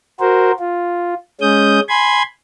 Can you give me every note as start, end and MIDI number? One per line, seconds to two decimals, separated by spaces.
0.20 0.52 66
0.20 0.52 70
0.20 0.52 72
0.59 1.14 65
1.41 1.80 56
1.41 1.80 61
1.41 1.80 87
1.41 1.80 91
1.89 2.23 80
1.89 2.23 83
1.89 2.23 84
1.89 2.23 92